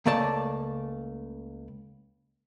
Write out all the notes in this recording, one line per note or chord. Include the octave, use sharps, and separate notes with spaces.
C#2 C#3 A3 A#3 D5 A5